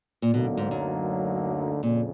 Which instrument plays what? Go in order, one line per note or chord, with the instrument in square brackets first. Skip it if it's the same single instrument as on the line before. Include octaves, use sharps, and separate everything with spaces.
[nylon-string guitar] A#2
[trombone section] D2 D3 F#3 A#3 D#4 [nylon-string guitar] B2
[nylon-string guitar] G#2
F#2
[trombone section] F2 C#3 [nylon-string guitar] A#2